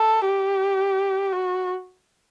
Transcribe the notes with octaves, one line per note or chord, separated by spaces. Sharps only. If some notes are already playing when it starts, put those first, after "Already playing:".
Already playing: A4
G4
F#4